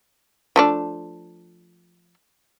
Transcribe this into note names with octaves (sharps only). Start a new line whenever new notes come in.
F3 A3 D4